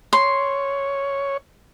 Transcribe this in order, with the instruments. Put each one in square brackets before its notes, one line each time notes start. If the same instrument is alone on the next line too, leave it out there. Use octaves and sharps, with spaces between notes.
[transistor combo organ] C#5 [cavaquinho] C6